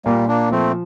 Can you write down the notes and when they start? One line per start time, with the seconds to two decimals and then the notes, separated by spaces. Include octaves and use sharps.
0.05 A#2 G3 A#3
0.28 A#3 D4
0.51 F3 A3 C4